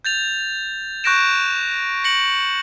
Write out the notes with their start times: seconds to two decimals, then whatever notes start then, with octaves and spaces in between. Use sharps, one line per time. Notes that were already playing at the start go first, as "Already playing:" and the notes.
0.05 G6 A6 F7
1.04 C#6 F#6 G6 A#6 D7 E7
2.04 A#6 C#7 F#7